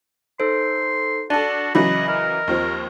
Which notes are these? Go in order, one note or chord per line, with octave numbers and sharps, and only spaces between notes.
D#4 A4 C5 C6
D4 F#4 A4 D5
C#3 E3 F#3 D#5 B5
A#4 D#5
D#2 F3 C4